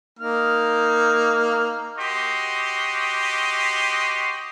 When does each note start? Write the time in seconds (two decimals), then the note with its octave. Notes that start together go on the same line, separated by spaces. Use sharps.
0.19 A#3 D#4 F6
1.99 F#4 G4 D#5 C6